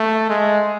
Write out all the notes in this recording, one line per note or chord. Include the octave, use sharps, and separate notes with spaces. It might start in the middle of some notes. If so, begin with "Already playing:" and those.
Already playing: A3
G#3